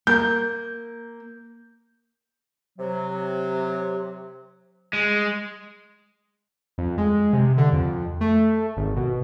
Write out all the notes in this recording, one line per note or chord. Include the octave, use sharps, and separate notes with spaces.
A#3 G6
C3 F#3
G#3
F2
G#3
C3
D3
F2
A3
G#1
B2